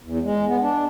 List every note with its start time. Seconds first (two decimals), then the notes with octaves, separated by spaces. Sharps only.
0.03 E2
0.22 G#3
0.48 B3
0.61 D4